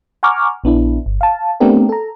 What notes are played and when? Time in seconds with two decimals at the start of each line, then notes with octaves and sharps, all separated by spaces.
0.23 F#5 G#5 A#5 C#6 D6 F6
0.64 A#1 B3 D4 E4
1.06 G1
1.21 F5 A5
1.60 A3 B3 C4 D4 G4 A#4
1.89 A4 A#5